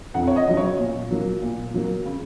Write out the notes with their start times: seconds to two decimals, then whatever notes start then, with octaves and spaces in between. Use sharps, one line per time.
0.14 F2 F#5
0.27 C#5
0.36 D#5
0.47 C#3 F#3
0.57 C#5
0.79 A#2
1.11 F#3 A#3
1.42 A#2
1.74 F#3 A#3
2.06 C#3